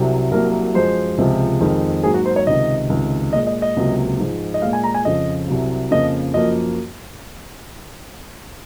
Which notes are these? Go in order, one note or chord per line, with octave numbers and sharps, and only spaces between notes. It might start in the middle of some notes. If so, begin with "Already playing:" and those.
Already playing: C2 C3 F#3
C2 C3 F#3 A#3 A#4
F#2 F3 G#3 C5
C#2 C3 F3 G#3
F2 D#3 G#3
G#2 F#3 A#3 G#4
F#4
C5
C#5
C#2 C3 D#3 D#5
C#2 C3 D#3
A#2 G#3 D#5
D#5
D#5
C#2 C3 F#3 A#3
G#2 F3 G#3
D#5
A#2 G#3 F5
G#5
A#5
G#5
F2 C#3 F3 D#5
C2 C3 F#3
F2 C#3 F3 A#3 D#5
F#2 F3 A#3 D#5